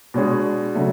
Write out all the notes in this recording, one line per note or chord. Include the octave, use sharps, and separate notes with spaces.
B2 G#3 D4 G#4 C#5
C#3 F#3 A3